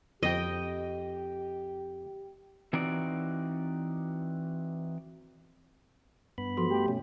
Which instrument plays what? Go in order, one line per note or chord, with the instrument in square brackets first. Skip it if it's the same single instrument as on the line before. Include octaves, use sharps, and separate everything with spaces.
[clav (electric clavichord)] F2 [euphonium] G4 [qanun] D#5 G5
[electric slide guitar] E3 C4 D#4 F#4 D5
[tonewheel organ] G2 B3 B5
[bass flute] F3 [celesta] F#4 A4 C6
[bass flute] A3 [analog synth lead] G4
[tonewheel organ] B2 C#4